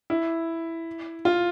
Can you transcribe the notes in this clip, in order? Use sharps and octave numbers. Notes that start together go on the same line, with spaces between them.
E4
F4